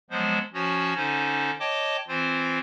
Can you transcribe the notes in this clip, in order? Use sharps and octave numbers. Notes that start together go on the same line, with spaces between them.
F3 F#3 G#3 B3 C5
F3 C#4 F#4 C#5
D3 C#4 D#4 C5
C#5 D#5 G5 A5 D6
E3 C4 F4 C5